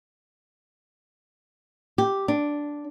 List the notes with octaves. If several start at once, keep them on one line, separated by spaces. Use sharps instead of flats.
G4
D4